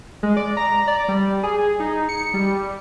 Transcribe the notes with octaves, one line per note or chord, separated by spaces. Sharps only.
G#3
D5
A#5
D5
G3
G#4
D#4
C#7
G3